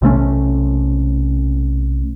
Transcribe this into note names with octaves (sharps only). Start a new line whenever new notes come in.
B1 C3 A3 C#4